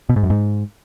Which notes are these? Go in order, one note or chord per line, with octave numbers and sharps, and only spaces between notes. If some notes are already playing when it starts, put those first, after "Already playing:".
B2
G#2
F#2
G#2